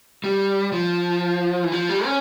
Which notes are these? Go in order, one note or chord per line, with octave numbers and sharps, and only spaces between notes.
G3
F3
E3
F3
G3
C#4